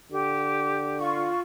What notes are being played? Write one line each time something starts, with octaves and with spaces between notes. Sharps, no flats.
D3 G4
F4 C#6